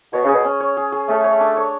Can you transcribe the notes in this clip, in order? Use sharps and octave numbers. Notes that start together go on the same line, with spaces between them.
B2 C#5
C#3
G#4
B2
C#4
C#5
G#4
G#4
A3 C#4
C#5
D4
C#5